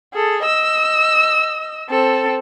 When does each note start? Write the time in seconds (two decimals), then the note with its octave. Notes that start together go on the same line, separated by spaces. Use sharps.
0.13 G#4 A4
0.45 D#5 E6
1.90 C4 A4